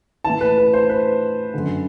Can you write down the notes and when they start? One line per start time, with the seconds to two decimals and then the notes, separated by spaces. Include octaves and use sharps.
0.24 A2 E3 A5
0.41 B4
0.58 B4
0.74 C5
0.89 B4
1.54 F#2 D3